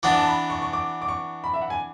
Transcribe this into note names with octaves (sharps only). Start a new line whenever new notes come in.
E3 B3 D4 D6
A5
B5
C#6
C#6
D6
D6
C#6
B5
E5
F#5
G#5